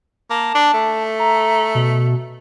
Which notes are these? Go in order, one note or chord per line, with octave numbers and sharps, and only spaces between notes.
A#3 A5
D4
A3
A#5
B2